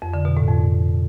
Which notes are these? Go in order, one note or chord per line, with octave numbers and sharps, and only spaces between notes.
F2
D3
B2
A2
F2